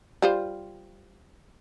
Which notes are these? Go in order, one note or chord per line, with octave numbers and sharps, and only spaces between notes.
G3 F4 C5